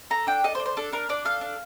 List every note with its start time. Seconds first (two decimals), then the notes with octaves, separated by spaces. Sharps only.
0.10 A4 A#5
0.27 D4 G5
0.44 A4 D#5
0.55 C5
0.60 D4
0.66 C5
0.77 D4 A4
0.92 D4 A#4
1.09 D4 D5
1.25 A4 F5
1.41 D4